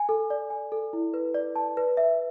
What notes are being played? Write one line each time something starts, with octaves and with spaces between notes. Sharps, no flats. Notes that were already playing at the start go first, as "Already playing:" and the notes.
Already playing: G#5
A4
D5
G#5
A4
E4
B4
D5
A5
B4
E5